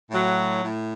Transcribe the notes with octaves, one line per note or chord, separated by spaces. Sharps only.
A2 F#3
A2